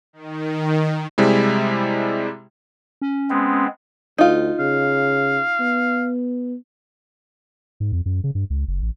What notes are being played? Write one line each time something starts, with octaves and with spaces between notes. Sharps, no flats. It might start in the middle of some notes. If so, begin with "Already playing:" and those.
D#3
C3 G3 G#3 E4
C#4
G#3 B3 C4
D2 D#4 F4
C#3 F5
B3
G#2
F2
F#2
C#3
G2
C#2
F#1
A1